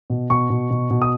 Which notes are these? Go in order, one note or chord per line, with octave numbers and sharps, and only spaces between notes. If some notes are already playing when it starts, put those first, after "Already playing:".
B2
B2 C#6
B2
B2
B2
D#6